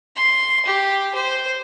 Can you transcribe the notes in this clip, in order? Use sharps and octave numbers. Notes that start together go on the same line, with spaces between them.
C6
G4
C5